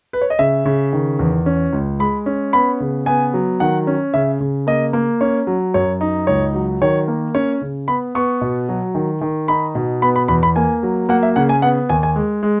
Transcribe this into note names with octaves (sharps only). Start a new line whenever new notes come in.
B4
C#5
D#5
C#3 E5
C#3
D#3
E2
C#4
C#2
G#3 B5
C#4
B3 B5
C#3
B3 G#5
F#3
D#3 F#5
C#4
C#3 E5
C#3
A#3 D#5
A#3
C#4 C#5
F#3
F#2 C#5
D#4
C#2 C#5
F#3
D#3 C#5
A#3
C#4 C#5
C#3
B3 B5
B3 C#6
B2
F#3
D#3
D#3
D#4 B5
B2
B3 B5
B5
E2 B5
B5
A#3 G#5
F#3
A#3 F#5
E5
C#3 F#5
G#5
B3 F#5
D#2 G#5
G#5
G#3
G#3